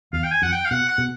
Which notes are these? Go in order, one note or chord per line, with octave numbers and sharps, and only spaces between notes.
E2 F5
G5
G#5
F2 F#5
G5
F5
B2 F#5
F#5
B2